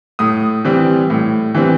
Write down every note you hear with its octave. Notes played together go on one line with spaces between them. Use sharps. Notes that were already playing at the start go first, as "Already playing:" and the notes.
A2 D#6
E3 G3 C4
A2
E3 G3 C4